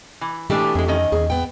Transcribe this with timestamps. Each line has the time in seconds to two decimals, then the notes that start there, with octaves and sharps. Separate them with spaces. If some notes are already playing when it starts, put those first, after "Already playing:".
0.21 E3
0.50 B2 E3 A3 D4 G4 G#5
0.75 F2 G#3 G#4
0.88 D#3 C#4 D#5
1.12 E2 G#4
1.30 B3 G5